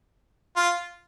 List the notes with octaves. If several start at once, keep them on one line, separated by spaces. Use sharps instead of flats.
F4